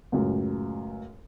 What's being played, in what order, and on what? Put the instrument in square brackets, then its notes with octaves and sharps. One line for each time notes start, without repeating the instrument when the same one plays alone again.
[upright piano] C#2 F#2 A2